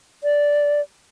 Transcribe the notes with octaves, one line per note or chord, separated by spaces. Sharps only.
D5